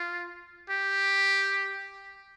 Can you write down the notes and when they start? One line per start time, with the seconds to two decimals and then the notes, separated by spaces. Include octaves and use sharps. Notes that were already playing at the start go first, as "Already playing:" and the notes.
Already playing: F4
0.70 G4